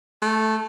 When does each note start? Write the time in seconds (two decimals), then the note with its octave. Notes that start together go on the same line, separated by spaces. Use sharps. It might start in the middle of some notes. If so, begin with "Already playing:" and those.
0.22 A3